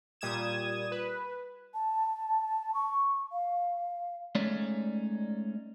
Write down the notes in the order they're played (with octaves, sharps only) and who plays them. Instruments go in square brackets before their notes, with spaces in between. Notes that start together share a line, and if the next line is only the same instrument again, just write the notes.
[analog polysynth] A#2 G3 D#6 G#6 E7
B4
[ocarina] A5
C#6
F5
[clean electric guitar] G#3 A3 C#4 D#4 C#5 D5